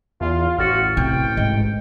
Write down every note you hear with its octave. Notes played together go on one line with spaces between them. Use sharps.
E2 F4
A1 F#4 F6 A6 C#7
C3 G5
G#2 D#5